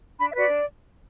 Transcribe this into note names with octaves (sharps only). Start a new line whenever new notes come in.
D4 B5
E5
F#4 B4 D5
D4